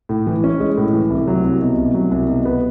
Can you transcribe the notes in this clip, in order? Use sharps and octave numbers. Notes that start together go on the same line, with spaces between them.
A2
E3
C#4
G#3
A2
E3
C2
F#3
C2
B2
C2
F#3
C2
B2
B3